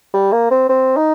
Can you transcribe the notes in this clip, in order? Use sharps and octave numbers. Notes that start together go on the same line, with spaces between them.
G3
A#3
C4
C4
D#4